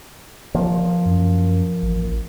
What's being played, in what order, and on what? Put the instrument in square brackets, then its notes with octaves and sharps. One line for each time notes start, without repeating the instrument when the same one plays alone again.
[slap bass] F3 A#3
[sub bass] F#2
A1